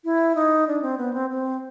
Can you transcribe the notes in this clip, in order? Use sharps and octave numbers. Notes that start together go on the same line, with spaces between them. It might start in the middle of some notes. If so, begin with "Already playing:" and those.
E4
D#4
D4
C4
B3
C4
C4